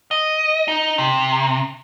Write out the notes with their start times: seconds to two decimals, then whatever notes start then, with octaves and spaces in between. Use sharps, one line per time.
0.11 D#5
0.68 D#4
0.98 C3